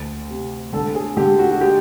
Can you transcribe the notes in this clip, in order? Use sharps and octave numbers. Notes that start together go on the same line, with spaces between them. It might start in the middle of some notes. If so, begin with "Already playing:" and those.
Already playing: D2
C3
D3 A4
G#4
D3 G4
F#4
F#4
G#3 G4